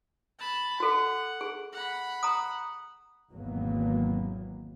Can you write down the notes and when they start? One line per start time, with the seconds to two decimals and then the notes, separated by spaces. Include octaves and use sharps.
0.39 A5 B5
0.80 F#4 A4 F#5
1.41 G#4
1.72 F#5 B5
2.23 A#5 D#6
3.31 G#1 E2 B2 F#3 A#3 B3